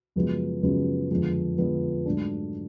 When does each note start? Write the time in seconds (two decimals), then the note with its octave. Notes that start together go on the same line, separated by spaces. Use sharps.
0.16 F#2 C#3 F3 G#3 B3
0.63 F#2 C#3 F3 G#3 B3
1.11 F2 D3 F3 G#3 B3
1.58 F2 D3 F3 G#3 B3
2.06 G#2 F#3 A3 D4